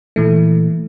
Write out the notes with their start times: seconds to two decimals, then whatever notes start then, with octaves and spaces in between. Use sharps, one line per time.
0.16 A#2 E3 A3